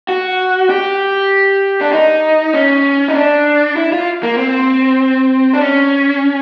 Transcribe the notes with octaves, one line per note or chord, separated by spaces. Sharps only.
F#4
G4
D4
D#4
C#4
D#4
D4
E4
F4
A#3
C4
D4
C#4